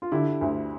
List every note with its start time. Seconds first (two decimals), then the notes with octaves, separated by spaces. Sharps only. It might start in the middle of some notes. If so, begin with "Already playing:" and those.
0.02 F4
0.12 D3 E4 G4
0.41 D2